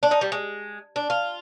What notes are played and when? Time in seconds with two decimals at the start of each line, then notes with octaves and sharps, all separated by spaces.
0.03 D4
0.11 D#4
0.21 G3
0.32 G#3
0.96 D4
1.10 F4